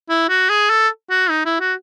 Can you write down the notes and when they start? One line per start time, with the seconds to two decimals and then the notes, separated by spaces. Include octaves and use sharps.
0.09 E4
0.29 F#4
0.49 G#4
0.70 A4
1.10 F#4
1.30 D#4
1.45 E4
1.60 F#4